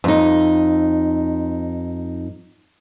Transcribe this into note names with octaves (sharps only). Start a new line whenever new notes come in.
F2 D#4